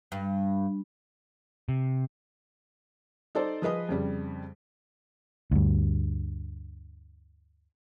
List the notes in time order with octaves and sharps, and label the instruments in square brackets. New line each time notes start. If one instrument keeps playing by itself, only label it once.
[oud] G2
[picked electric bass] C3
[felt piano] D#4 A4 C5 D5
F3 G#4 B4 D#5 D#6
F2 C#3 G3
[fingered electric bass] D2 G2